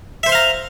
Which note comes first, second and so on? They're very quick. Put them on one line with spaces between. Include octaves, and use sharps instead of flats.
E5 C5 C6 F5 A#5